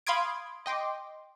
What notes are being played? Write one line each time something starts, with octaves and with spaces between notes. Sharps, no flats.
F5 B5 C6 D#6 G#6 D7
D#5 G5 C6 D6